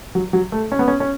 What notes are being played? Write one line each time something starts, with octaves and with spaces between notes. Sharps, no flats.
F#3
F#3
A3
C#4
B3
C#4
C#4